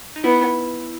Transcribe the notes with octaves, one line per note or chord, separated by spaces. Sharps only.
D#4
B3 E4